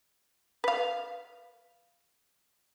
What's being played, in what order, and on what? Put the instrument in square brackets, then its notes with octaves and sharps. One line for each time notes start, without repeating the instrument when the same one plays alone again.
[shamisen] B4 F5